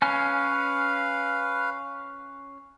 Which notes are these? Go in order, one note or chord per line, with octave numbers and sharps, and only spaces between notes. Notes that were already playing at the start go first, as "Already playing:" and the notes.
C#4 B4 F5 G#5 F6